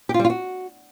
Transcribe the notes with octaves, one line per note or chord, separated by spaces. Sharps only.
G4
F4
G3
F4
F#4